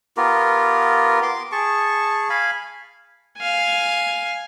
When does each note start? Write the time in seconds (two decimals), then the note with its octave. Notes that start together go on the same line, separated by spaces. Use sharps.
0.17 B3 F4 G4 A#4
1.23 C6 D6
1.52 G#4 A5 C#6
2.30 F5 G#5 B5
3.38 F5 G#5